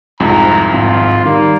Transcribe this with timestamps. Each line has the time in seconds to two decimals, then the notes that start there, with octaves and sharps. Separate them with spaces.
0.20 C2 F2 G#2 A#5
0.74 G#1 F4
1.25 D#3 G3 A#3